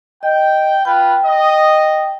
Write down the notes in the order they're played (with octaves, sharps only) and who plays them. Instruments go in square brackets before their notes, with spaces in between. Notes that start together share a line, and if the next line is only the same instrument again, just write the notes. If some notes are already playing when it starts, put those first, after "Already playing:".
[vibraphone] D#5 [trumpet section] G5
[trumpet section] F4 B4 [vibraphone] G5
[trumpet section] D#5